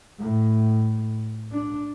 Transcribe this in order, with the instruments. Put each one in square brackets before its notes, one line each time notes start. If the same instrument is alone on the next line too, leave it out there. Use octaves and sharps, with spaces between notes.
[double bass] A2
D4